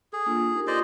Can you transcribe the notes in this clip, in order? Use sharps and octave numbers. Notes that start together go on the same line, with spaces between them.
G#4 A4
A#3 D4 F4
D#4 G4 A#4
F4 A4 C5 D5 D#5